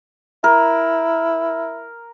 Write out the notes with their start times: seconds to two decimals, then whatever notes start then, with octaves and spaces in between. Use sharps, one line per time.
0.44 E4 A#4